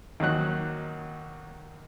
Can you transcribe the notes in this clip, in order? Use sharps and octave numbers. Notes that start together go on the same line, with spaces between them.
D#2 D#3 F#3 F#6